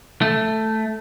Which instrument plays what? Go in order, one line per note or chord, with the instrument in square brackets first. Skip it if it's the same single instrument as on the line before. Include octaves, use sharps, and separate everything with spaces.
[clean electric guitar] A3